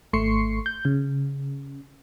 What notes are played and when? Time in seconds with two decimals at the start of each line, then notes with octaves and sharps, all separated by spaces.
0.13 G#1 A3 C6 C#6 C7 C#7
0.66 G6
0.85 C#3